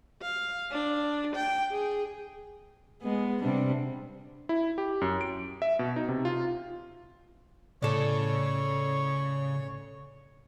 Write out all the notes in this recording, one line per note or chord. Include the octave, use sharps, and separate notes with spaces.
F5
D4
G5
G#4
G#3 B3
C3 G3 D4
E4
G4
F#2
D7
E5
B2
D#4
C3
F4
A2 C#3 A4 C#5 D5